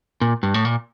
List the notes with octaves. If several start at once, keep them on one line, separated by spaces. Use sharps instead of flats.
A#2
G2
A2
A#2